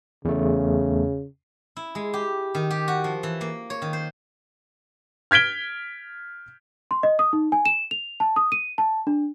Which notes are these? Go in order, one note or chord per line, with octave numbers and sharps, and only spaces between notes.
E2 C#3 A3
E4
G#3
G4
D#3
G4
F#4
F3
E3
A#3
C#5
D#3
C5
F6 G#6 B6 D7 G7
C6
D#5
D#6
D#4
G#5
E7
F7
A5
D#6
D#7
A5
D4